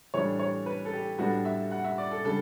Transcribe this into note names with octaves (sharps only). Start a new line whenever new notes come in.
A2 E3 G3 D4 C#5
C#5
B4
A4
G4
A2 G3 B3 D4 F#4
E5
F#5
E5
D5
A4
C#3 G3 D4 A4